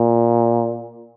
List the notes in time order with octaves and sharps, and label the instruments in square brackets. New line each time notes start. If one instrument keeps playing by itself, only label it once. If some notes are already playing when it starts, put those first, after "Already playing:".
Already playing: [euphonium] A#2